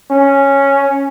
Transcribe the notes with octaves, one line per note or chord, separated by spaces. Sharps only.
C#4